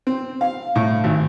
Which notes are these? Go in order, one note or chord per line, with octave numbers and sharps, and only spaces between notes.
C4
F5
A2
G#1